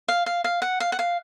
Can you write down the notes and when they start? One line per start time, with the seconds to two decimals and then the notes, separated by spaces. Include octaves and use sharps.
0.08 F5
0.26 F5
0.44 F5
0.62 F#5
0.80 F5
0.92 F#5
0.99 F5